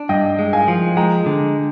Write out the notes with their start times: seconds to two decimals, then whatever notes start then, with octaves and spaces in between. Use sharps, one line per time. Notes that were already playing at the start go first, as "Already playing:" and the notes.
Already playing: D4
0.09 G2 D#5 G5
0.39 G#3
0.53 F5 G#5
0.68 F3
0.97 G#3 G5 A#5
1.26 D3